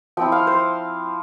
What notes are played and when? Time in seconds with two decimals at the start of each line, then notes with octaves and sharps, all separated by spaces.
0.17 F3 C4 E4 G5
0.32 F5
0.47 C5